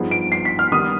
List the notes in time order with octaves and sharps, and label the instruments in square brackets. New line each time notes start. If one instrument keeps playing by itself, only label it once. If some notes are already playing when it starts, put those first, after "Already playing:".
Already playing: [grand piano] G2 F3 B3 D#4 G#4
[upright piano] D7
C7
B6
F6
[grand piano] D#3 G3 B3 [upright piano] D#6